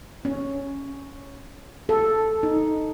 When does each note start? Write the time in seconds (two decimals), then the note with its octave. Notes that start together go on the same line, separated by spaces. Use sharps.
0.25 C#4
1.89 A4
2.43 D#4